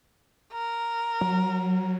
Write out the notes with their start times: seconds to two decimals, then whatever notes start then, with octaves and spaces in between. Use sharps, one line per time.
0.53 A#4
1.21 F#3